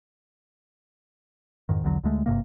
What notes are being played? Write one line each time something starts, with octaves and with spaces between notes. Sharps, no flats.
F2 G#2 D#3
B1 E2 D3 F#3
D2 D3 G#3 A3
G#1 G2 C3 A#3